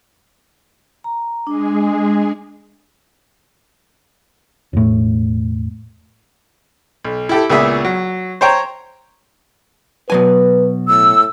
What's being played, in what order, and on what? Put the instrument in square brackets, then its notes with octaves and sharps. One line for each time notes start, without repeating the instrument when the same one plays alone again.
[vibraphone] A#5
[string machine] G#3 G#4 [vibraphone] D4
[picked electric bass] E1 A2
[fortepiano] B1
E4 G4 A4
C#2 A#2 A#3 B3 G#4 E5
F#3
C5 C#5 G5 A#5
[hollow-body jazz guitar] B2 F#3 G#5 [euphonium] B4
[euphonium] A2 [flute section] E6